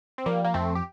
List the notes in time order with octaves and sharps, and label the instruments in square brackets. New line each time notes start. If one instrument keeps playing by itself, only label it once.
[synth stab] C4
[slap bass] F3 [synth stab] G3 A#3
[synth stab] A#3
[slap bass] F2 [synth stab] A3 C4
[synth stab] G4